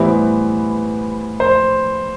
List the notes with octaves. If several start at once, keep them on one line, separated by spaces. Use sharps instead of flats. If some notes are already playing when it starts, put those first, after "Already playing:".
Already playing: A2 E3 G3 B3 E4 C5
C5